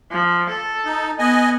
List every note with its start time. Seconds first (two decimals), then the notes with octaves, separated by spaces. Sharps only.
0.11 F3
0.49 A4
0.85 D#4
1.19 B3 D#5 G#5